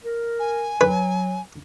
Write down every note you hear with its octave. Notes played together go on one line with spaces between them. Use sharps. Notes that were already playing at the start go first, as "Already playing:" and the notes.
A#4
G#5
F#3 B4